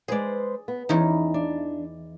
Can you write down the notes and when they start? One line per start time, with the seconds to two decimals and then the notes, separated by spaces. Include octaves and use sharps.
0.08 G#3 G#4 B4 C5 D5
0.68 B3
0.89 E2 E3 C#4 D#4
1.34 D4